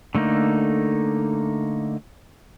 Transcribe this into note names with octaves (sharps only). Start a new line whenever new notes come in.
D3 A3 A#3 D#4